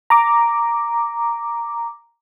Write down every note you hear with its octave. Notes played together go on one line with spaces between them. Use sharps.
A#5 D6